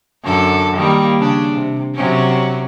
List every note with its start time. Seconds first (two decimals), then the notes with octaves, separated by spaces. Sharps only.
0.24 F#2 D3 A4
0.75 D#3 G3 A#3
1.19 C#3 D4
1.55 C3
1.94 C3 F#3 C#4